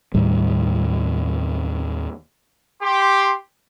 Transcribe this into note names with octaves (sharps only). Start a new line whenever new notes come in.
D#2 A2 G3
G4 C6